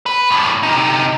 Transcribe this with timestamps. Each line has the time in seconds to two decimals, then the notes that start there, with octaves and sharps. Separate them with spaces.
0.06 B4
0.31 E2 A2
0.63 C3 D#4